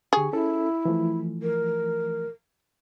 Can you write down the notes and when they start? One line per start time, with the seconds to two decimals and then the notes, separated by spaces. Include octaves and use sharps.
0.13 D3 G4 G#4 C#6
0.33 C#4 E4 A4
0.85 E3 F3 A3
1.42 A#4